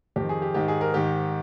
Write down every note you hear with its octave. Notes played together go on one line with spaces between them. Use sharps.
F2 D#3 G4
G#4
G4
G#2 D#3 G4
G#4
A#4
G#2 D#3 G4